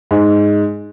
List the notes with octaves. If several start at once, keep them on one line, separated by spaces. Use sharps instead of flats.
G#2